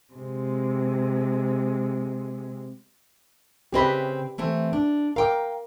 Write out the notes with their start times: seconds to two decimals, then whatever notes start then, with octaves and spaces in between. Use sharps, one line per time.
0.14 C3 G#3
3.72 C#3 C4 G4 B4 D#5 B5
4.38 E3 A3 C4
4.73 D4
5.16 A#4 F5 G5 D6